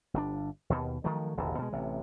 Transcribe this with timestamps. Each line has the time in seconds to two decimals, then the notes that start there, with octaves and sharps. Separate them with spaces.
0.14 G1 C3 D4
0.70 D#2 B2
1.04 D#3 F3 F#3 A3
1.37 E1 A1 D#2 D3
1.58 B2 G#3
1.72 A1 C3